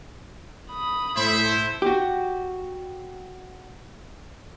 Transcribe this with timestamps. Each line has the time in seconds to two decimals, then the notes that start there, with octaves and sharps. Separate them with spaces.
0.70 B5 D#6
1.17 A2 A3 E4 C5 E5
1.82 F#4 G4